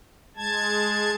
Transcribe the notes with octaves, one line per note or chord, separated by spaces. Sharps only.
G#3 A5 G#6